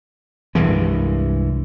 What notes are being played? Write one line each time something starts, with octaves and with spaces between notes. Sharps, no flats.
C2 G2 E3 G#3